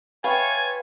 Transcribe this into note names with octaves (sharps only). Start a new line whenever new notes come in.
F4 B4 C#5 E5 G5 G#5